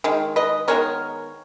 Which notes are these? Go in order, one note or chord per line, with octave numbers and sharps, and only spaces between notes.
D#3 G#3
B4 D#5
D#3 G#3 B3 A#4 C#5